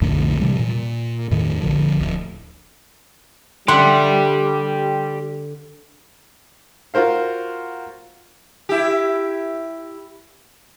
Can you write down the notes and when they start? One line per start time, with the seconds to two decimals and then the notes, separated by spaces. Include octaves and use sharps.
0.01 B1 F2 A2 D3
0.40 C3 E3 G3
0.59 A#2
1.31 E2 A2 D#3
1.62 A#1 D3 F3
1.99 D1
3.68 D3 G3 G4 D5 E5 F#5 C6
6.94 F4 F#4 A#4 C5 F5
8.69 E4 G4